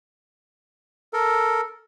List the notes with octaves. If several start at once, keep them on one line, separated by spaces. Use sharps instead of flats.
A4 A#4